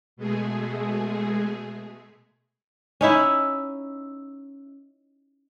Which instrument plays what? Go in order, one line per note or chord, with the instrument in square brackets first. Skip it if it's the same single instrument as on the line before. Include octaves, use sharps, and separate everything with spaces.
[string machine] B2 G#3 A3 G#4
[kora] C#4 D#4 E4